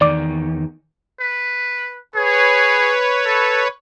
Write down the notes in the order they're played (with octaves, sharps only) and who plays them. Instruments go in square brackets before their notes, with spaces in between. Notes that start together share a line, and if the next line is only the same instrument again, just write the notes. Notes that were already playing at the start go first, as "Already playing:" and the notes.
[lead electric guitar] E2 D#3 [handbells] D5 D6
[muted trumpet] B4
[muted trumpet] G#4 [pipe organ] B4 C#5
[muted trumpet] A4